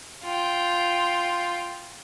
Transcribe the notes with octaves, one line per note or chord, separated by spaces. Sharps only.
F4 G5